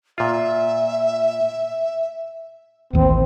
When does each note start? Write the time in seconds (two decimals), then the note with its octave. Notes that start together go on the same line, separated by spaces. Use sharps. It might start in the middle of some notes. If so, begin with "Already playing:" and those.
0.18 A#2 F4 E5
2.93 A1 D#2 E3 C4